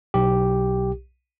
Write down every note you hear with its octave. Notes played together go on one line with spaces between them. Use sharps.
B1 G4